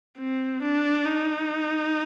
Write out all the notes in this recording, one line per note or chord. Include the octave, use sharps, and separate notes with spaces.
C4
D4
D#4